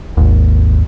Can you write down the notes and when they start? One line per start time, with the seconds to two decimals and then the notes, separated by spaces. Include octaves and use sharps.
0.17 G#1 D#2